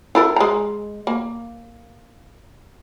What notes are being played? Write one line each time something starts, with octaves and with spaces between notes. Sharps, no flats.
E4 A4 A#4
G#3 A#5
A#3